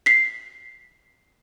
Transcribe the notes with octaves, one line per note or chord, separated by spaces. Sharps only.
B6 C7